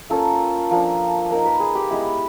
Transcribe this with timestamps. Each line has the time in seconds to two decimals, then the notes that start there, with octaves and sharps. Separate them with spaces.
0.10 A#3 C#4 F4 A4
0.71 F3 A#3 D4
1.31 A#3 D#4 A#4
1.45 B4
1.60 G#4
1.75 G4
1.90 G#3 B3 E4